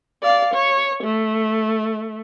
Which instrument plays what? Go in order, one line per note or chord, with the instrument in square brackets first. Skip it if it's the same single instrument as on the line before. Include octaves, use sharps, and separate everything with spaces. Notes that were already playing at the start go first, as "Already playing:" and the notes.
[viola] D5 F5
C#5
A3